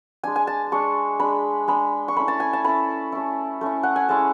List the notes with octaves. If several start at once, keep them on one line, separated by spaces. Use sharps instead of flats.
G#3 D4 G#5
G#5
A5
G#3 D4 C#6
G#3 D4 B5
G#3 D4 B5
C#6
A3 C#4 E4 B5
A5
G#5
A5
A3 C#4 E4 B5
A3 C#4 E4
A3 C#4 E4
F#5
G#5
G#3 C#4 E4 A5